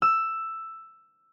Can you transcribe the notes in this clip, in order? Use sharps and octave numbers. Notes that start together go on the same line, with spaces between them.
E6